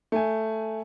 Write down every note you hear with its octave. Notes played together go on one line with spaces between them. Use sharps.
A3 G#5